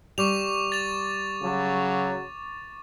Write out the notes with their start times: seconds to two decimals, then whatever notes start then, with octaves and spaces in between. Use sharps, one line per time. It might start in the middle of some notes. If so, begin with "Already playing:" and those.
0.18 G3 C#6 D6 F7
0.72 A6 F7
1.42 C#3 F#3